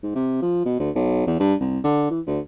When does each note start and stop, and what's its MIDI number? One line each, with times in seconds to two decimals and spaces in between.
0.03 0.15 44
0.15 0.38 48
0.42 0.61 53
0.65 0.77 47
0.79 0.90 38
0.95 1.23 35
1.27 1.38 40
1.40 1.54 43
1.61 1.79 36
1.84 2.07 50
2.10 2.20 52
2.27 2.39 38